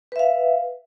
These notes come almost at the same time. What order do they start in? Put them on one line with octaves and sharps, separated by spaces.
B4 E5 F5